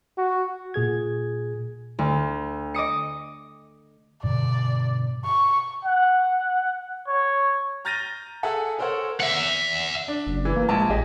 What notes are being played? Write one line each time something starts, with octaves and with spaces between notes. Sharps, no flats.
F#4
A#2 G#4 G#6
D2
D#5 D6 D#6 C#7
G2 B2 D3 D5
C#6
F#5
C#5
A#5 F6 G6 A6 A#6 D#7
G#4 A4 E5 F#5 A5
A4 A#4 C5 C#5 F#5
E5 F#5
D4
F#1
E3
A#3
A#1 G#3 A5
A1 G4 G#4 D#5